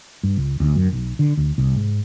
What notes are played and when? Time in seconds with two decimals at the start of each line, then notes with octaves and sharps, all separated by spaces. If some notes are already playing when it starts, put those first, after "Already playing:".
0.23 G2
0.37 C#2
0.60 D2
0.76 F#2
0.92 B1
1.19 D3
1.37 D2
1.58 C2
1.76 G#2